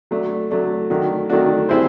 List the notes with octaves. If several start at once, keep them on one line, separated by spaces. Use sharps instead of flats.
F#3 A3 D4
F#3 A3 D4
D#3 F#3 A3 D4 F#4
D#3 F#3 A3 D4 F#4
G3 C4 E4 G#4 C5